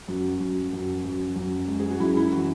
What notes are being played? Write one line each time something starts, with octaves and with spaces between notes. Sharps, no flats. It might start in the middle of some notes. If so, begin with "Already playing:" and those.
F#2 F#4
F#2
F#2
F#2
F#2
G#3
G#4
F#4
F#2 E4
E4
E3 F#4